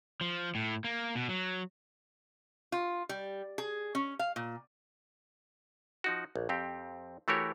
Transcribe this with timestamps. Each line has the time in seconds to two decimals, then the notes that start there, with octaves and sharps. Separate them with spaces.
0.21 F3
0.55 A2
0.84 A#3
1.15 B2
1.29 F#3
2.72 F4
3.09 G3
3.58 G#4
3.95 C#4
4.19 F5
4.36 A#2
6.04 F3 D#4 F#4
6.36 A#1
6.49 F2 C4 G4
7.28 E3 A3 F#4 G4 A#4 C#5